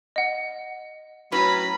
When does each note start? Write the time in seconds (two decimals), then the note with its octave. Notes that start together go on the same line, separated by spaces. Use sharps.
0.16 D#5 F#5
1.32 A2 F#3 C#4 B4 A#5 B5